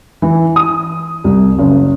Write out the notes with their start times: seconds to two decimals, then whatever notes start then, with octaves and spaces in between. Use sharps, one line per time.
0.22 E3
0.56 D#6
1.24 C2
1.59 F#1